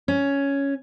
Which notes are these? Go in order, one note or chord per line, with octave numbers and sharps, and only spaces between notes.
C#4